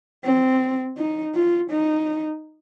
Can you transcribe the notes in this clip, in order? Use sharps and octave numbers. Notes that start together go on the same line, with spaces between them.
C4
D#4
F4
D#4